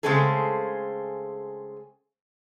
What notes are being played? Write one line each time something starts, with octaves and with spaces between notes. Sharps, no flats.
C#3 G#3 A3 C4 G#4 A4